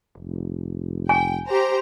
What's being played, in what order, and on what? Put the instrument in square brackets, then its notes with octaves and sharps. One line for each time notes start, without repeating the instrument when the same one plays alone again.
[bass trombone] F1
[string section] G5 [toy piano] G#5
[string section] G4 C5 A#5